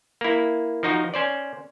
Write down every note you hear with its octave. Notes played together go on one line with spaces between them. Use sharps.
A#3 E4
F3 D#4 F#4
C#4 C5 D5